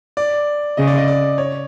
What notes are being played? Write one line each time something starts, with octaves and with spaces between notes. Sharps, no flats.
D5
C#3 D#5
D5
D#5
D5
C#5